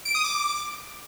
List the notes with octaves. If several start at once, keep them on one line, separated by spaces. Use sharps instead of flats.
D7
D#6
D6